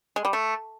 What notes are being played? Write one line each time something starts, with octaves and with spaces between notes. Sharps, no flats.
G#3
G3
A3